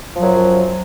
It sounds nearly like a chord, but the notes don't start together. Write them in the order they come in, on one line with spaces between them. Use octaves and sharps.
F3 F#3 F#2